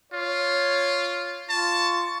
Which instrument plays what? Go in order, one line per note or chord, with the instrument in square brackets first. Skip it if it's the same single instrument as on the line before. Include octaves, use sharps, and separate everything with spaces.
[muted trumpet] F4 [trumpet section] C#5
[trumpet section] F4 C#6 [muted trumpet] A5